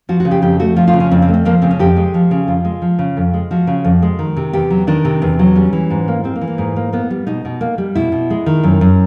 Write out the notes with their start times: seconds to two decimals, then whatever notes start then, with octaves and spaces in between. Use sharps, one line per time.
0.09 F3 F#4
0.20 F#4
0.25 C#3
0.31 G4
0.42 F2 G4
0.60 A3 F#4
0.76 F3 F4
0.88 F4
0.93 C#3
1.00 C#4
1.11 F2 C4
1.22 C4
1.29 A3
1.34 C4
1.45 F3 A#3
1.62 C#3 C4
1.71 C#4
1.79 F2 G4
1.96 G#3
2.14 F3
2.31 C#3
2.47 F2 F4
2.65 G#3
2.82 F3
2.99 C#3
3.17 F2
3.34 G#3
3.51 F3 F#4
3.67 C#3
3.84 F2
4.02 G#3
4.19 D#3
4.37 C3
4.53 E2 G4
4.70 F#3
4.87 D#3 D4
5.05 C3
5.22 E2
5.39 F#3
5.55 G3 C#4
5.73 E3
5.90 G#2
6.08 A#3
6.24 G3 C4
6.36 A#3
6.41 E3
6.47 A#3
6.58 G#2
6.76 A#3
6.93 A#3 B3
7.11 G3
7.27 B2 D#4
7.45 B2
7.61 A#3
7.78 G3
7.95 B2 E4
8.12 B2
8.30 G#3
8.46 D#3
8.63 F#2
8.81 F#2